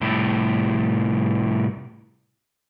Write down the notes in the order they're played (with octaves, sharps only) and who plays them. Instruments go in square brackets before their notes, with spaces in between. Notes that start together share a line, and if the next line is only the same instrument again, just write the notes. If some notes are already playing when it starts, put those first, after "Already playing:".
[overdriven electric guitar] C2 A2